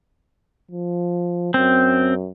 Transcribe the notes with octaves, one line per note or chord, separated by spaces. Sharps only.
F3
F#2 C4